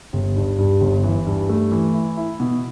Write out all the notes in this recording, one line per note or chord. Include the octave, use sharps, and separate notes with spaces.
G1
G2
G2
G1
E3
G2
A3
E3
E4
E4
B2